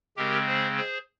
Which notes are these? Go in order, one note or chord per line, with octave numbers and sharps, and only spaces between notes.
C#3 G#3 C4 G4 A#4
G#4 C5
G#4 C5